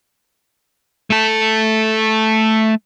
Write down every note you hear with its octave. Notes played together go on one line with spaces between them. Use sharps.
A3 A4